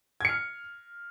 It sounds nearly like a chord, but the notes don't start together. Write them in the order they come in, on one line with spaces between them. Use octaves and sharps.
G#6 C#7 F6